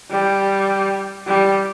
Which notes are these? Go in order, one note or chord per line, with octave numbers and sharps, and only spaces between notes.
G3
G3